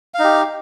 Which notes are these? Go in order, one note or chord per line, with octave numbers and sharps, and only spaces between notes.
D#4 G4 F5